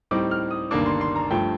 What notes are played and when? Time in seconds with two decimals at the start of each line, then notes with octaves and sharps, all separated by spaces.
0.11 A2 G3 C4 D#4 D6
0.31 F6
0.51 D#6
0.71 G1 G2 D#3 A#3 D4 D6
0.86 C6
1.01 C6
1.16 A#5
1.31 G2 F3 A3 G5